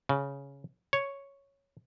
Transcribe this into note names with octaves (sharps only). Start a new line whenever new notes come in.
C#3
C#5